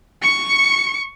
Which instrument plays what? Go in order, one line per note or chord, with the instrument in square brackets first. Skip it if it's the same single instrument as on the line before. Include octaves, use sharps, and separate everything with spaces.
[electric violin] C#6 C#7